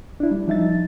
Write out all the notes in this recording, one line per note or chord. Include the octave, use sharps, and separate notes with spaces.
D4 E4
G3
F3 D#4 E5 A6